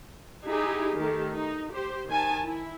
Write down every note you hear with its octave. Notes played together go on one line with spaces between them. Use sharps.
D#4 E4 G4 G#4
D#3 A3 G4 A4
D#4
G4 C5
D#3 G#5 A5
E4